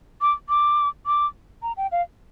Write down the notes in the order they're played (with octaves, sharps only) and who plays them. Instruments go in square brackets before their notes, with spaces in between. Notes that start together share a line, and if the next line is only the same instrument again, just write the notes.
[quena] D6
D6
D6
A#5
G5
F5